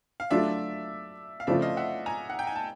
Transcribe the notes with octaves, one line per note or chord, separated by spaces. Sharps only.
F5
F#3 A3 D4 F4 D5 E5
F5
C#3 F3 A3 C4 F4 D5 E5
D#5 F5
E5 F#5
G#5 A#5
F#5
G5
G#5
A5